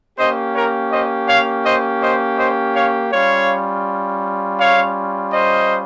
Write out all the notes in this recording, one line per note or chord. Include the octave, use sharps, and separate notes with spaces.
A#3 C#4 G4 C5 D#5
A#4 C#5
C5 D#5
C#5 F5
C5 D#5
C5 D#5
C5 D#5
C#5 F5
G3 C#4 F4 C#5 F5
C#5 F5
C5 D#5